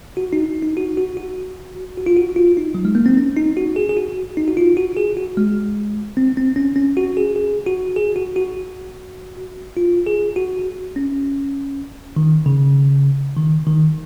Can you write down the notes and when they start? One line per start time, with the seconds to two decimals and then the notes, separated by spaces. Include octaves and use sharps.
0.17 F#4
0.33 D#4
0.62 D#4
0.77 F#4
0.97 F#4
1.17 F#4
1.97 F#4
2.06 F4
2.17 F#4
2.36 F4
2.57 D#4
2.75 F#3
2.85 G#3
2.95 A#3
3.06 C4
3.17 C#4
3.37 D#4
3.57 F#4
3.76 G#4
3.89 G#4
3.97 F#4
4.37 D#4
4.48 F#4
4.57 F4
4.77 F#4
4.97 G#4
5.17 F#4
5.37 G#3
6.17 C4
6.37 C4
6.56 C#4
6.76 C#4
6.97 F#4
7.17 G#4
7.36 G#4
7.66 F#4
7.96 G#4
8.16 F#4
8.36 F#4
9.77 F4
10.06 G#4
10.36 F#4
10.96 C#4
12.16 D#3
12.46 C#3
13.36 D#3
13.67 D#3